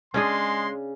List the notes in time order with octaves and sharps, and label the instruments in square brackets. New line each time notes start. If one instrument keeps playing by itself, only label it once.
[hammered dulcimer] C#3 [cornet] G#3 [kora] C#4 D4 G#4 [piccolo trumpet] C6